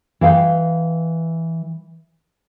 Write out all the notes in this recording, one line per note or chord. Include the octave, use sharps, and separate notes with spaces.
E3 F5 G5